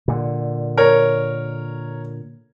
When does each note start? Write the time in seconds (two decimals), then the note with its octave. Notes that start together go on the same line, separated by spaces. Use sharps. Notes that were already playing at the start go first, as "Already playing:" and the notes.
0.08 A#2 D3
0.78 A#4 C#5